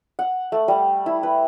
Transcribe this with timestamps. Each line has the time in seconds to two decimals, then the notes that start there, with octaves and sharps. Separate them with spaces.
0.19 F#5
0.52 A3
0.68 G3
1.06 E4
1.23 B4